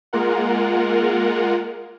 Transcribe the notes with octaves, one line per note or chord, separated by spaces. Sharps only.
G#3 A#3 F4 A#4 F#5